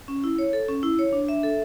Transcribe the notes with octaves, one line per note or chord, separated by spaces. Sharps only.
C#4
E4
C#5
A4
C#4
E4
C#5
D4
E5
A4